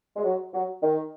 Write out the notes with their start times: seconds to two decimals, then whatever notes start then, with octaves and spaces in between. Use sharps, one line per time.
0.16 G#3
0.23 F#3
0.53 F#3
0.82 D#3